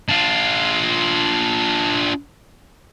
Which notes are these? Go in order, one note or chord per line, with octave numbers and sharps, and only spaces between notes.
D4 F4